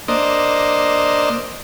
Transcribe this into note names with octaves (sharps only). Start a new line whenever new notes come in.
A#3 D4 C5 D#5